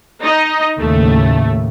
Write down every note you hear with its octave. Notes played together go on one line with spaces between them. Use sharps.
D#4 D#5
D#2 A2 C#3 A3